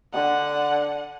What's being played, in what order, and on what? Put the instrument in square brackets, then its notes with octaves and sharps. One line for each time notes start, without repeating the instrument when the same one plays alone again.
[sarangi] D3 [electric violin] F#5